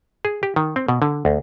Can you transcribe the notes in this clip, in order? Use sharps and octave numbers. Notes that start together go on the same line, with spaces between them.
G#4
G4
D#3
C4
B2
D3
D2